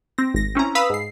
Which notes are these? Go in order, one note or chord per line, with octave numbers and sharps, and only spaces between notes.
C4 A#6
G#1 A#6
C4 C#4 E4 A#5
B4 F5 B5 D#6 E6 B6
G#2 C7